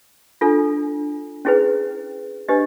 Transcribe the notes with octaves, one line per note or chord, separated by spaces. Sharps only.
D4 F4 A4
C#4 E4 G#4 B4
D4 G4 B4 D#5